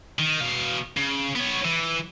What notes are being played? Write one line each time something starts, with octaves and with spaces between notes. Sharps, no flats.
D#3
B2 F5
C#3
B3 C#5
E3